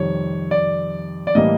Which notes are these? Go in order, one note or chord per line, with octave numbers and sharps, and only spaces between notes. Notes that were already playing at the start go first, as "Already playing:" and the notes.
Already playing: F2 C3 D#3 G3 C#5
D5
D5
A2 E3 G3 A#3 D#5